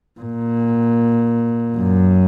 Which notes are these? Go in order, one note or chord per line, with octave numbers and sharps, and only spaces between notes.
A#2
F#2